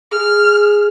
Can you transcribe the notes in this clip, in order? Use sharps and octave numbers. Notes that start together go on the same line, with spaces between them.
G#4 F6